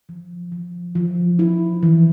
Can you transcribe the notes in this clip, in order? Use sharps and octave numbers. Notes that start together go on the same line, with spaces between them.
F3
F3
F3
E4
E3